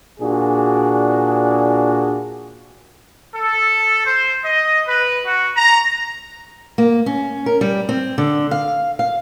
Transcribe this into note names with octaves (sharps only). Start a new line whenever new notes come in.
A#2 D4 F#4 G#4
A4
C5
D#5
B4
F#4
A#5
A#3
C#4
A#4
G3
C4
D3
F5
F5